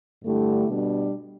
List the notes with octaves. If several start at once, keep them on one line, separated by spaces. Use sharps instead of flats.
G2 D3 A3 E4 G4
B2 G3 D4